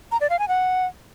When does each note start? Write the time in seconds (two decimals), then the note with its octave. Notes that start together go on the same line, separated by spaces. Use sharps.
0.12 A#5
0.21 D5
0.30 F5
0.39 G#5
0.48 F#5